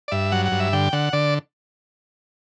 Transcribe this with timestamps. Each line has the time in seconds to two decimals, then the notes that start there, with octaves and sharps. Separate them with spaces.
0.08 D5
0.11 G2 E5
0.32 F#3 F#5
0.45 F#5
0.52 G2
0.60 E5
0.73 D3 G5
0.93 D3 F#5
1.13 D3 D5